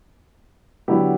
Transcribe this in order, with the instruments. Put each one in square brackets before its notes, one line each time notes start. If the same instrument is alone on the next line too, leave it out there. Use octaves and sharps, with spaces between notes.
[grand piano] D3 F#3 B3 E4 G4